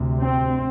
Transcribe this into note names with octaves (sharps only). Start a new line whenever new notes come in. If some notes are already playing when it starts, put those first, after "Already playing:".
Already playing: D2 C3
C4